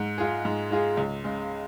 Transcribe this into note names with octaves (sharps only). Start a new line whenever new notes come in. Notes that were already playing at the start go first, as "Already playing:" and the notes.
Already playing: G#2
G#3 F4 G#4
G#2
G#3 F4 G#4
C#2
C#3 G#3